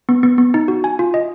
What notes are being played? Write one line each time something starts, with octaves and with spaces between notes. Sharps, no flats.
B3
B3
B3
D#4
F#4
G#5
F4
D#5